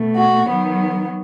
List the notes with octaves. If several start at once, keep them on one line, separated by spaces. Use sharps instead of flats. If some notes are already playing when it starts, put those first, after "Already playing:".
Already playing: B2 A3
F#4
D#3 F#3 B3